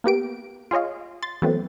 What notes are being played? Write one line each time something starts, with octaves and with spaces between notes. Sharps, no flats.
A#3 B3 G4 D7
F4 G#4 C#5 D#5 F5
C6 A6
E3 F#3 A3 B3 C4